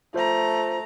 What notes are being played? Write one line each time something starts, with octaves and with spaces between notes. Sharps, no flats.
A3 F4 C5 A#5